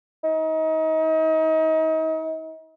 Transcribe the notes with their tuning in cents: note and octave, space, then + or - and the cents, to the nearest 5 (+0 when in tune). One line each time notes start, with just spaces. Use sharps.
D#4 +35